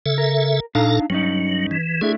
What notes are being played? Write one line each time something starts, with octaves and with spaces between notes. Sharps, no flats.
C#3 A4 E5
A#4
A#2 D4 D#4 A4 F5 A#5
G2 F#3 C#4 D#4
E3
A3 D4 E4 G#4